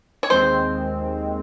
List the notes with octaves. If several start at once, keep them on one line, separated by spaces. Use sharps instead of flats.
C#5
D#2 D#3 G#3 C4 C5